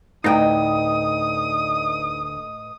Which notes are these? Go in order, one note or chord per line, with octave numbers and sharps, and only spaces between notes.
D2 A2 D#4 B4 D#5 G5 D#6